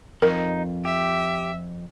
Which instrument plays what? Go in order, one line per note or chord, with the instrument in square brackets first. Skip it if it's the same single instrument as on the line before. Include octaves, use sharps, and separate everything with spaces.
[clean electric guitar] F2 [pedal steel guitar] D#4 [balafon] A#4
[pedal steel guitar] G4 [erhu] E5